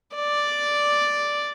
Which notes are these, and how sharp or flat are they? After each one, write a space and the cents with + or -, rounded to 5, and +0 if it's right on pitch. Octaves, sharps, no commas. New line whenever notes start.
D5 +0